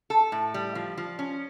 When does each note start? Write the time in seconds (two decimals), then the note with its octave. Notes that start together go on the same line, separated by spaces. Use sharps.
0.10 A4
0.32 A2
0.54 G3
0.75 F3
0.98 F3
1.19 C#4